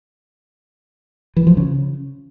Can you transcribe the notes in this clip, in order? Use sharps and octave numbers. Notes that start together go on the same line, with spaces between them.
E3
F3
C#3